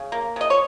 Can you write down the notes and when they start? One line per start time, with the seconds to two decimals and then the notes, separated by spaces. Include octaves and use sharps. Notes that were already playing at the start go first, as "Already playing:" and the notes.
Already playing: C#3
0.12 A#3
0.36 C#3 D#5
0.50 C#5